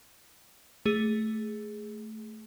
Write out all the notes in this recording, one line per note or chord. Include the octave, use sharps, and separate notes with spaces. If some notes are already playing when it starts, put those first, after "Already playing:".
A3 G#4